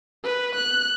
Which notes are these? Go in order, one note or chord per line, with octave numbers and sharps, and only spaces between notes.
B4
F#6